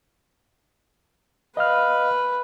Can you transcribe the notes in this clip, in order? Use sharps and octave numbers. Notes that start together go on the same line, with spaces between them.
B4 D#5 F5 F6